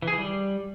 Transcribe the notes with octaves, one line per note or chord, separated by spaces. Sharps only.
E3
G#4
E3
G3